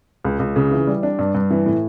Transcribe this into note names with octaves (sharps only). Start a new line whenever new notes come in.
C#2
C#2
C#3
E3
G3
D4
G2
G2
E3
A2